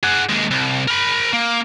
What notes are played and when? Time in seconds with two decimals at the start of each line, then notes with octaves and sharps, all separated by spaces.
0.03 G#4 F#5
0.29 D#2 G#3
0.51 C2
0.88 A#4 B5
1.33 A#3